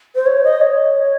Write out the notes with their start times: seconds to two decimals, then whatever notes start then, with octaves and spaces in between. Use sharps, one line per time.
0.15 C5
0.26 C#5
0.44 D#5
0.61 C#5